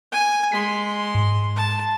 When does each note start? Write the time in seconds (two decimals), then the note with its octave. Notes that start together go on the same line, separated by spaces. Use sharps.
0.12 G#5
0.52 G#3 C6 B6
1.15 G#2
1.56 A5